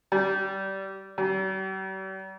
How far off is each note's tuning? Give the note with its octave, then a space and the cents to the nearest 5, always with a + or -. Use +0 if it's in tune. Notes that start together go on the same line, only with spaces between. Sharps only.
G3 -20
G3 -45